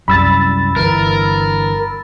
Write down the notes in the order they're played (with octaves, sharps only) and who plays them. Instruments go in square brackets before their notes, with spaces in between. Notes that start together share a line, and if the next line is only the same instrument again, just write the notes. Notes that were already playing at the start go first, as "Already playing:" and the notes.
[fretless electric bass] C2 F#2 G3 [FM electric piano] B5 E6 A6
[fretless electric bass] G1 G2 E3 [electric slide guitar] A#4